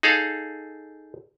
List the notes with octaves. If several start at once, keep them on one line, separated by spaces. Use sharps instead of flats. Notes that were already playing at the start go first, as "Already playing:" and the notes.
D#4 G#4 A4 F5